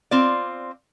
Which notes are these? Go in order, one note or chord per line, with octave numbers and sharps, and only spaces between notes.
C4 F4 D5